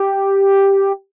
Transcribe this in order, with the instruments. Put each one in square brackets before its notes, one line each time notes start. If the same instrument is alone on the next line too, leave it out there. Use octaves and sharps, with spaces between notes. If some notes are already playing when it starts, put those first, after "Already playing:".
Already playing: [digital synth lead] G4